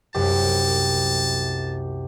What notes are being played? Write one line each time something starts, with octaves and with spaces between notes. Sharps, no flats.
C2 F#2 G4 A5